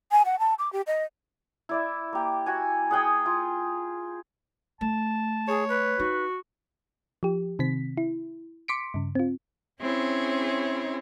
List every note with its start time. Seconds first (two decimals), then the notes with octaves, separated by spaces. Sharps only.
0.12 G#5
0.25 F#5
0.39 A5
0.59 D6
0.73 G4
0.87 D#5
1.69 E4 D5 E5
2.13 A#3 G4
2.46 F#4 G#5
2.91 G#4 F#5 G5 D#6
3.26 F4
4.81 A3 A5
5.48 G#4 C#5
5.69 B4
5.99 D#4 F#4
7.23 F3 G4
7.59 C3 D#3 C4 B6
7.98 E4
8.68 C6 D6 B6 C#7 D7
8.94 G2 C#3
9.15 C4 F4
9.80 C4 C#4 E4 G#4 C#5